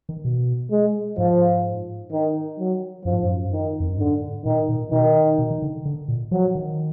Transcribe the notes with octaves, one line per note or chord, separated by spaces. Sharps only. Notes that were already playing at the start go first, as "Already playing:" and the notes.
D#3
B2
G#3
G#2 F3
D#3
F#3
F#2 F3
G#2
F#2
D#3
F2
F#2
G#2 D3
A#2 D#3
A#2
B2 D#3
B2
D#3
D3
D3
A#2
F3 F#3
D#3